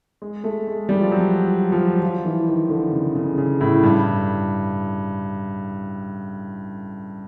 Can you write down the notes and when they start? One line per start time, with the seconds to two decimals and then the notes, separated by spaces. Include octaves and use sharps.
0.22 G#3
0.44 A3
0.67 G#3
0.89 G3
1.00 F3
1.11 F#3
1.72 F3
2.02 F3
2.25 E3
2.47 D#3
2.70 D3
2.93 C#3
3.15 C#3
3.38 C#3
3.61 A2
3.83 G2